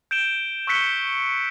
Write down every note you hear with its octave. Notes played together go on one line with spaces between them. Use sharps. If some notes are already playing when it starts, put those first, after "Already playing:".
G6 D7 E7 G7
C#6 E6 F#6 B6 C#7 G7